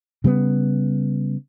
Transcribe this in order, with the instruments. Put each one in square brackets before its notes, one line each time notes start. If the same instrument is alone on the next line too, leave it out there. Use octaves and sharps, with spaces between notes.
[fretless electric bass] C#3 G3 G#3 B3